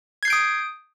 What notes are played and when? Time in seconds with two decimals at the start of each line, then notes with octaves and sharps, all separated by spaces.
0.23 G#6
0.25 C7
0.28 G6
0.30 D7
0.33 D#6